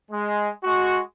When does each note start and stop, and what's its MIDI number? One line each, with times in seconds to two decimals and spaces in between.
0.11 0.48 56
0.64 0.99 56
0.64 0.99 66